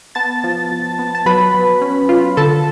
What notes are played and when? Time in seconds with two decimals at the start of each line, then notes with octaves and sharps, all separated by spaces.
0.15 B3 A5 A6
0.44 F3
0.72 F3
0.99 B3
1.15 A5
1.26 F#3 B4 B5
1.54 F#3
1.82 C#4
2.09 F4
2.37 D3 A4 A5